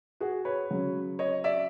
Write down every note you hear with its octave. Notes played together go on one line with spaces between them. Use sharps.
F#4 G#4
B4 C#5
C#3 F#3
C#5 D#5
D5 E5